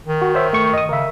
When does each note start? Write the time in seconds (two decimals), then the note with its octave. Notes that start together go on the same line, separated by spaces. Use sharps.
0.06 D#3
0.22 F#4
0.35 C5 C#5 E5
0.53 A3 C#6
0.74 D#5 D#6
0.89 C#3 A#4 E5